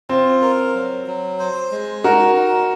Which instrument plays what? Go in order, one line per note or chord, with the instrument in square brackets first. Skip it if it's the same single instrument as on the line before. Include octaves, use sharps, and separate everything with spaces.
[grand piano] C4 [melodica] F4
[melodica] A#4
F#3
F#3
C5
G#3
[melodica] D#4 [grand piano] F#4 A#4
[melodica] D#4